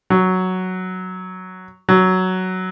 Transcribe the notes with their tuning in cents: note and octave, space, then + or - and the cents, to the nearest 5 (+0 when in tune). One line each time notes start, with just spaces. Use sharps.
F#3 +0
F#3 +5